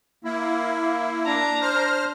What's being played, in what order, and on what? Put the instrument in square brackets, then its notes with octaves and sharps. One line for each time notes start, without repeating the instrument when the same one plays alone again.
[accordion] A#3 E4
[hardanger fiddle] D4 A#5
[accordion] C5 F6